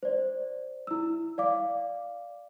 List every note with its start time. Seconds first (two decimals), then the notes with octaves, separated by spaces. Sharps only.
0.03 C5 D5
0.87 E4 E6
1.38 D5 F5 D6